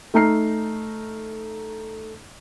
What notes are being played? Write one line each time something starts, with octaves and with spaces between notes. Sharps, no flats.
A3 D#4 A#5 F6 C7